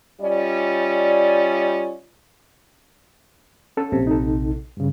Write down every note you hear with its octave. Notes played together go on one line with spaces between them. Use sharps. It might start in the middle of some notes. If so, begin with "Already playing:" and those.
G3 C#4 F4 D5 D#5
C#4 A4
A#1 C3
D#4 A4
G2 C#3